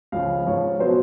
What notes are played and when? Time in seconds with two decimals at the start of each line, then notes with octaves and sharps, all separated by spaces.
0.12 C#2 C#3 F3 F5
0.46 G#2 F3 C#5
0.80 B2 F#3 C5